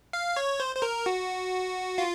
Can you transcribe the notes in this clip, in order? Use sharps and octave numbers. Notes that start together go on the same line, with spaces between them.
F5
C#5
C5
C5
A#4
F#4
F4